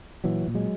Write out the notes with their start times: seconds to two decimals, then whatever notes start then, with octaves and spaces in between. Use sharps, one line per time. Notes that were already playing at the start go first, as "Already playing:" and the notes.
0.24 A#2 E3 F#3
0.48 A#2
0.55 F#3 G#3